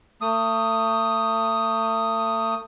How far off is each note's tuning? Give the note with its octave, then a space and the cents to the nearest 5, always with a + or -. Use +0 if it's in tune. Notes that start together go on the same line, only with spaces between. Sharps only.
A3 +35 D#6 +0